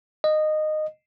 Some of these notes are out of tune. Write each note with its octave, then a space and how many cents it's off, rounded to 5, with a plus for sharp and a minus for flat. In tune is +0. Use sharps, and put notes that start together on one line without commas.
D#5 -15